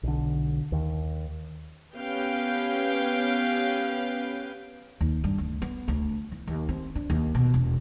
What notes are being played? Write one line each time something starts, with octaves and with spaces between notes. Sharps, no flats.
B1 D3
D#2
B3 C#4 G4 B4 F5 G5
D#2
G2
D2
B3
D2
E3
D#2
C4
D4
D#2
B2
E1